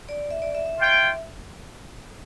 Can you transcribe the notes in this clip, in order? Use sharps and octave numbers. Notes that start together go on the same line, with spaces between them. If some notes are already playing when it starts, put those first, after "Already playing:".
D5
E5
D5
E5
E5
F4 C#5 G5